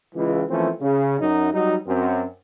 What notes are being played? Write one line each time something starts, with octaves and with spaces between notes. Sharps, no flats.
C#2 E3
E3 F3 A3 A#3 C4 C#4
C#3
F#2 F#3 D#4
F#3 G3 D#4
F#2 C4